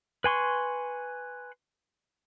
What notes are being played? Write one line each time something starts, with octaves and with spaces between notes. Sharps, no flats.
B4 G#5 C6 C#6